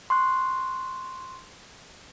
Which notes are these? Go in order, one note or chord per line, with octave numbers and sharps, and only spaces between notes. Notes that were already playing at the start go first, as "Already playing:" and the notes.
C6 C#6 F#6